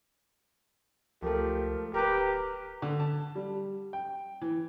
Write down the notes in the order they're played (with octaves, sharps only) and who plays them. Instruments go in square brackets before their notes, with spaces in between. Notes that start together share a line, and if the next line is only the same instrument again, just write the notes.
[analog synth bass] C#2 [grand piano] F3 A3 [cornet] G4 [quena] A#4
[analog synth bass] D1 [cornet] G4 [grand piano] A#4 B4 [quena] A#5
[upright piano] D3
A5
G3
G5
E3